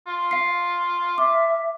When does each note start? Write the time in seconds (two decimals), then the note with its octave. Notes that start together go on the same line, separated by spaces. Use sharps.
0.07 F4
0.31 F5 C7
1.18 E5 D6